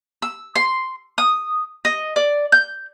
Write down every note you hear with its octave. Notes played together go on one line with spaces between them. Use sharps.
E6
C6
D#6
D#5
D5
G6